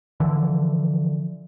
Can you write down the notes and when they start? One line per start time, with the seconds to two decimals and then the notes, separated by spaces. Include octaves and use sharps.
0.20 D3 E3 F3